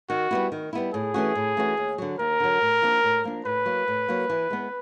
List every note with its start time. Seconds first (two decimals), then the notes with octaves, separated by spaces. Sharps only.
0.09 D#3 F#4
0.31 G3 B3 E4
0.52 D#3
0.73 G3 B3 E4
0.93 A2 G#4
1.14 E3 A3 C#4 F#4
1.35 A2
1.57 E3 A3 C#4 F#4
1.77 D#2
1.98 D3 F#3
2.19 D#2 A#4
2.40 D3 F#3
2.61 A2
2.82 F3 A#3 D4
3.04 A2
3.24 F3 A#3 D4
3.45 A2 B4
3.66 F#3 A#3
3.88 A2
4.08 F#3 A#3
4.30 E3
4.50 G#3 B3